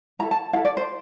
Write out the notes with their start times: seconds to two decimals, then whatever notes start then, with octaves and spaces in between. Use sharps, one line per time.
0.19 E4 A#5
0.23 A4
0.31 A5
0.53 E4 F5
0.56 A4
0.65 D5
0.77 C5